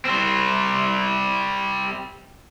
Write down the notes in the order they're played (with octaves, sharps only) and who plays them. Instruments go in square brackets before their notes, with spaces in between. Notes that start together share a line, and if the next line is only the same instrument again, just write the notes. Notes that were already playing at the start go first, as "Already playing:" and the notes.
[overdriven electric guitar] G3 C4